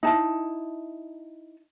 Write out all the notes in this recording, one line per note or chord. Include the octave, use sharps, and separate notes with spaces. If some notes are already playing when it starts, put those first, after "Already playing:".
D#4 E4 A5